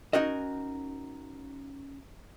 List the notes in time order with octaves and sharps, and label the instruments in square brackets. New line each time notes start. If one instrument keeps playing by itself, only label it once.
[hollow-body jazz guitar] C#4 D#4 F#4 A#4 D#5